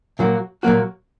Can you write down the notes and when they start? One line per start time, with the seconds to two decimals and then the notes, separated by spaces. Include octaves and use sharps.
0.19 A#2 F#3 A#3 F#4
0.63 A#2 F#3 A#3 F#4